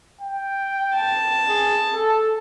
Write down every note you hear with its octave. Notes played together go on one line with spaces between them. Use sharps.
G5
A5
G#4
A4